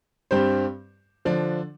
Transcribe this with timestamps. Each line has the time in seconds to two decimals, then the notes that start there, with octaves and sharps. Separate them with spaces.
0.31 G2 G3 C4 G4 C5
1.25 D3 F3 D4